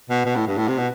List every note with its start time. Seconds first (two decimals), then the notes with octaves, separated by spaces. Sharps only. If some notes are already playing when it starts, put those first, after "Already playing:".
0.10 B2
0.25 B2
0.36 A2
0.47 G2
0.58 A2
0.68 C3
0.78 B2